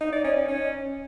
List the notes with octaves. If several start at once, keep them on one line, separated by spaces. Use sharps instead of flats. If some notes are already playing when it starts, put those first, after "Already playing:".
D#4
D5
C#4
D#4
C#4